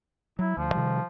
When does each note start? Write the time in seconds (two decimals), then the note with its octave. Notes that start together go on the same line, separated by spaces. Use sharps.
0.39 F#3 E4
0.57 D2 F3
0.74 C3 D#3 G3